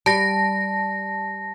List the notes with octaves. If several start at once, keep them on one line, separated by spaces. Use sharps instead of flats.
G3 A5 A#6